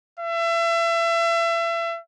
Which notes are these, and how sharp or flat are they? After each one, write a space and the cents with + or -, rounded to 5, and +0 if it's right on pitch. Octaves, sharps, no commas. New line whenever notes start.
E5 +35